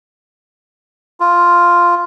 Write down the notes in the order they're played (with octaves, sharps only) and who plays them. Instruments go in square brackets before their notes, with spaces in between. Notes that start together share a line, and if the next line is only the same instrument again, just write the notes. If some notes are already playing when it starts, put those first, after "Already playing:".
[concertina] F4